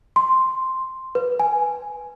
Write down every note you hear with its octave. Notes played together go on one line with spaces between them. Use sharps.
C6
B4
G#5